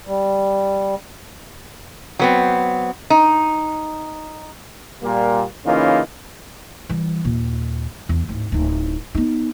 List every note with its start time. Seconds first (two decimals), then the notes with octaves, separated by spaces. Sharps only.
0.07 G3
2.19 F#3 B3 C4
3.10 D#4
5.03 A#2 G3 A#3
5.66 C#3 E3 A#3 C#4 D#4 F4
6.89 E3 G3
7.24 D#2 A#2
8.09 E2
8.29 D1 G#2
8.52 D1 D#4
9.15 B3 D#4